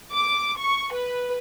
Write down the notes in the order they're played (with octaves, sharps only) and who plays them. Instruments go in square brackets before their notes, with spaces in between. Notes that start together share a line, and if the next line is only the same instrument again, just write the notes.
[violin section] D6
C#6
B4